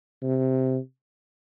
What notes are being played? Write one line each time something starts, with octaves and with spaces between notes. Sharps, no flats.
C3